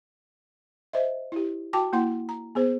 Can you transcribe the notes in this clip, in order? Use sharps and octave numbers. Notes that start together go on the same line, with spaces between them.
C5 D#5 E5
E4 G4
F#4 G5 A5 D6
A#3 E4 F#5 C6
A#5
B3 G#4 C5